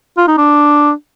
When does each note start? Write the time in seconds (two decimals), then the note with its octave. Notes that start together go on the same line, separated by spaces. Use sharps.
0.17 F4
0.27 D#4
0.37 D4